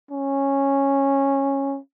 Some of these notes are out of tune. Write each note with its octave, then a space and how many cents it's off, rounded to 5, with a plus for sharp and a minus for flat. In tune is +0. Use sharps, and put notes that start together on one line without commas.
C#4 -10